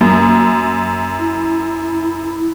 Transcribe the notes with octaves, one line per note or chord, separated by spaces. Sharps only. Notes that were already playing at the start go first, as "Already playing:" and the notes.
F#2 A#3
E4